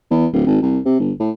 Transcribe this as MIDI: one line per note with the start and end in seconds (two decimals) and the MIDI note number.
0.11 0.27 40
0.33 0.44 26
0.46 0.62 32
0.62 0.79 36
0.85 0.99 48
1.00 1.12 31
1.20 1.31 45